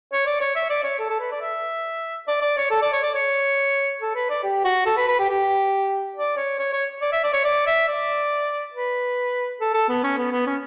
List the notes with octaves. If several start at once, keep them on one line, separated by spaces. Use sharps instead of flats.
C#5
D5
C#5
E5
D5
C#5
A4
A4
B4
D5
E5
D5
D5
C#5
A4
D5
C#5
D5
C#5
A4
B4
D5
G4
F#4
A4
B4
B4
G4
G4
D5
C#5
C#5
C#5
D5
E5
D5
C#5
D5
E5
D5
B4
A4
A4
B3
C#4
B3
B3
C#4